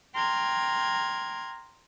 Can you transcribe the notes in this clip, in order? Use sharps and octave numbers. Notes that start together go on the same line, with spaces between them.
G5 A#5 C6 F6 G#6